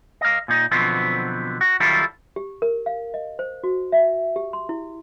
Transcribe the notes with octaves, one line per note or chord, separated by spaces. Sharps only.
D#5 F5
A#2 D#4
B2 D3 F3 F#3 B3 C4
F#4
D#3 F#3 G3 E4 F4 A4
G4
A#4
F5
D#5
C5
F#4
E5
G4
C6
E4